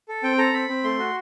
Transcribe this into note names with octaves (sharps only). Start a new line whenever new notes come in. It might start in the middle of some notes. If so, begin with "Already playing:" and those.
A4
C4 G5
A4 A#5
C4 B5
C4
A3 C6
F#4